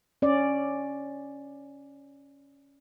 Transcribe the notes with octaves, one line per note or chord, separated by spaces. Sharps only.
C#4 D5